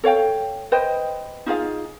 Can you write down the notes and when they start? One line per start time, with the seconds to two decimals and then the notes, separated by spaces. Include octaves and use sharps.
0.04 A4 C#5 F5 G5
0.72 B4 C5 D#5 G5
1.46 D#4 F4 G#4 F5